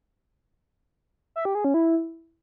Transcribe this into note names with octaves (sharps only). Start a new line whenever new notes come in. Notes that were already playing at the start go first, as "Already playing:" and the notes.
E5
G4
G#4
C#4
E4